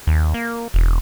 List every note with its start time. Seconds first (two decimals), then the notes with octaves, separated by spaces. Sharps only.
0.07 D#2
0.34 A#3
0.74 E1